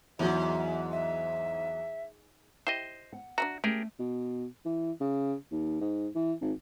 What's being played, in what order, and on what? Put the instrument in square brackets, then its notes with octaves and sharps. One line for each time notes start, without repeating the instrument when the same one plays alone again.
[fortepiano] E2 F#3 [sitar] G#2 [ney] E5
[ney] E5
[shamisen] E4 G4 [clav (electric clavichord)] C5 D#5
[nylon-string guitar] F#5
[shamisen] D4 E5 A#5 [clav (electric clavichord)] F#4
[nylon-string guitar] A3 [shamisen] C#4 [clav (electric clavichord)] G4 G#4 A#4
[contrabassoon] B2
E3
C#3
D#2
G#2
E3
G#1